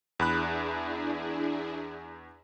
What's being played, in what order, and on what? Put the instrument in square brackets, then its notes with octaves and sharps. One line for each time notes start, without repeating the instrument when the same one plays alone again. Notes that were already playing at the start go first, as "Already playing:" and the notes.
[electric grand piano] E2 B5 F#6 [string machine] D4 E4 G#4